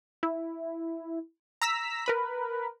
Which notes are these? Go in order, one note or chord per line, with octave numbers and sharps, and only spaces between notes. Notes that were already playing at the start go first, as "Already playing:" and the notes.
E4
A#5 E6 B6
A#4 B4 B5